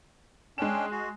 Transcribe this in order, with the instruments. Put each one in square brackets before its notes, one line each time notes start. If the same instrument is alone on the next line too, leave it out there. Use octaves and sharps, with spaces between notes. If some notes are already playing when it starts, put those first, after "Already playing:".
[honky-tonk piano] G#3 E7 [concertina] C#4 D4 G5
[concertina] F#4